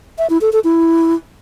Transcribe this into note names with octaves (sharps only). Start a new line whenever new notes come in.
E5
E4
A4
A4
E4